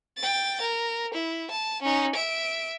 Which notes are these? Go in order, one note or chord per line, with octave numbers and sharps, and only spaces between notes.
G5 A6
A#4
E4
A5
C#4 D#4
E5 D7